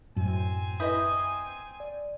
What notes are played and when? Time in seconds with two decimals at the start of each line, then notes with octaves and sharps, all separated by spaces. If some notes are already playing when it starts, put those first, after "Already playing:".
0.17 F#2 A2 C4 G#5
0.80 E4 B4 D#5 D#6 G6
1.80 D5